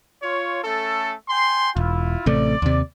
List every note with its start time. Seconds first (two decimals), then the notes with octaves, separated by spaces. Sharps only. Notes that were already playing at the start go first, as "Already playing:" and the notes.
0.23 F4 C#5
0.63 A3 C#4 A4
1.29 G5 G#5 C6
1.77 E1 E4 F4
2.26 A1 C3 A3 D5
2.62 D#2 C3